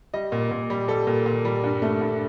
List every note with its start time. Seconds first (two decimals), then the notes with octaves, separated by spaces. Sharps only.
0.14 G3 D#5
0.32 A#2
0.51 A#2
0.70 G3
0.88 G3 A4
1.07 A#2
1.26 A#2
1.45 G3
1.63 G2
1.82 A3
2.01 G2